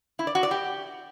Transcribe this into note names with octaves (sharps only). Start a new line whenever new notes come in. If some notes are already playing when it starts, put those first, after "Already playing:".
E4
D5
F#4
D5
G4